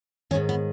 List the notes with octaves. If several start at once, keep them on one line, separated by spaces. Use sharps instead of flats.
G#2 D#3 C#4
B3